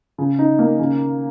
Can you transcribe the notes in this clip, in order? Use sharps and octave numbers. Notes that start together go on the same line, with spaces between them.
C#3
D#4
A#3
C#3